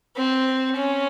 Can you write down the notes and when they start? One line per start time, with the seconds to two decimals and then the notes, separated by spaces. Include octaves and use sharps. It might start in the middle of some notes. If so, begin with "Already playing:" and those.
0.16 C4
0.76 C#4